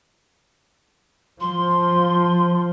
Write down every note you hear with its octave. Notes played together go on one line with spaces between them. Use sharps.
F3 C6